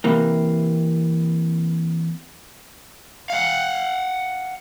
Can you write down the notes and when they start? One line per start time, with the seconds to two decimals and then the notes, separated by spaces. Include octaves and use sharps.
0.04 C3 E3 A#3
3.30 F5 F#5